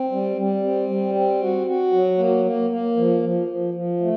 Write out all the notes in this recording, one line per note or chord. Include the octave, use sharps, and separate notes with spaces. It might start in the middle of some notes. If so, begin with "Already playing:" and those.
Already playing: C4
G3
G3
C4
G3
C4
F#4
F#4
F#3
A#3
A#3
A#3
F3
F3
F3
F3
A3